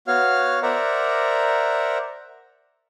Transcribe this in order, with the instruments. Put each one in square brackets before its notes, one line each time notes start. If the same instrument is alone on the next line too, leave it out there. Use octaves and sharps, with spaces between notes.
[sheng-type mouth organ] B3 F#4 C#5 F5 F6
A#4 C5 D5 E5 F#5 A#5